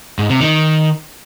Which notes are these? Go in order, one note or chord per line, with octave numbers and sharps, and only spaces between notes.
G#2
C3
D#3